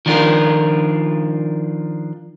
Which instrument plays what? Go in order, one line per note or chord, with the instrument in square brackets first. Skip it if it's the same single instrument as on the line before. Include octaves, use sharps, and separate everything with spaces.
[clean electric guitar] D#3 F3 D4 F4 A#4